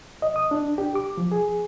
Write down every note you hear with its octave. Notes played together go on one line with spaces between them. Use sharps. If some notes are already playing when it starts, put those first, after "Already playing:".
D#5
D#6
D4
G4
D6
F3
G#4